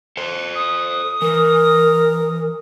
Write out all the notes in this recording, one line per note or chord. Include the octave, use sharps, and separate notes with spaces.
A4 C5
D#6
E3 A#4